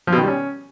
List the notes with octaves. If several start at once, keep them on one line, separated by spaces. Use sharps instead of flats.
F3
B2
D#3
G3
C#4